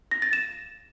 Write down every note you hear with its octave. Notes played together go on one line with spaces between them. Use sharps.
A#6
A6
E7